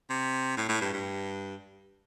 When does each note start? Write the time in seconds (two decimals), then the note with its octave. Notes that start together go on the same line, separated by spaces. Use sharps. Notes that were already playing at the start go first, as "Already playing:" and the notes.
0.10 C3
0.57 A2
0.69 A2
0.81 G2
0.93 G2